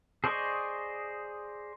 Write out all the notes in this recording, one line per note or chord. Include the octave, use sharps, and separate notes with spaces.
G#4 C5 D5 D#5 C#6